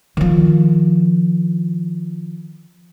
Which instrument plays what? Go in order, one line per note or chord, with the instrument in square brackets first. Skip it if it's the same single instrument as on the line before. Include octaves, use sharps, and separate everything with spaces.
[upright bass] D#3 F3